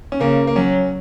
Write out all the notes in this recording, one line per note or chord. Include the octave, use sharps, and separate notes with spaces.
C#4
C#3 A#3
A#3
F#3 C#4